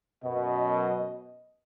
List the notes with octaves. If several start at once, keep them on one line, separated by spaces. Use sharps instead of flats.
F#2 B2 D#5